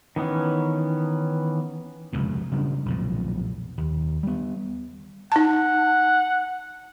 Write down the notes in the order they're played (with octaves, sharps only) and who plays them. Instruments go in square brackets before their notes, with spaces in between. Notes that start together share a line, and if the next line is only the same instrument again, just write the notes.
[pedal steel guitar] D#3 E3 B3 C#4
[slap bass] F1 C#2 F#2 B2
C#3 G3 D4
B1 F2 A#2
D#2
G3 B3
[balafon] D#4 A5 [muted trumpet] F#5